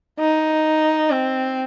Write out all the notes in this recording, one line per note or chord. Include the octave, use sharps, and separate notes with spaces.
D#4
C4